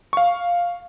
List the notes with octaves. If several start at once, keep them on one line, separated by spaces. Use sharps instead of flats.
F5 C#6